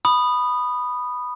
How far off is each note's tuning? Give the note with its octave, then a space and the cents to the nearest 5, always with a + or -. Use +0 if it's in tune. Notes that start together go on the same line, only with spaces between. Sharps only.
B5 +0 D#6 -15